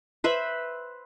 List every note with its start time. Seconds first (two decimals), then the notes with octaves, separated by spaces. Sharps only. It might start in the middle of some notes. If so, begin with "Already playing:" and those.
0.24 B4 C5 E5 B5